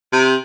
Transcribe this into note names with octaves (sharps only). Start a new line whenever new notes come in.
C3